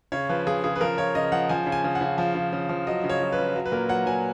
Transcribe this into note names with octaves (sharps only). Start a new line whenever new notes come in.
C#3 C#5
F3 B4
F3 G#4
C#3 G#4
B4
F3 A#4
F3 C#5
C#3 D#5
F3 F#5
F3 G#5
C#3
G#5
C#3
F#5
C#3
F3
C#3
C#3
F3
F#3 D#5
C#3
C#5
F#3
B4
C#3
F#3
B4
A#2 A#4
F#3 F#5
F#3 G#5